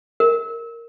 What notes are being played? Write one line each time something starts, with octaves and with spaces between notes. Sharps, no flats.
A#4